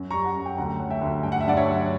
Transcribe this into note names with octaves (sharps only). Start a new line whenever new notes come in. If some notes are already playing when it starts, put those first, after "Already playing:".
Already playing: F#2
G3 A#5 C#6
F#5 A#5
F#2
G5
D2 F#5 A#5
F#3
E5 G5
D2
G2 G5
F#5
E5
G2 D5 F#5
C#5 E5
F#3